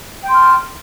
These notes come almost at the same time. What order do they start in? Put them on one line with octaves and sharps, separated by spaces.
G5 C6 F6 A5